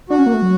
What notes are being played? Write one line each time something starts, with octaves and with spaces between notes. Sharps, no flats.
D4 F#4
C#4
A#3
A3
F#3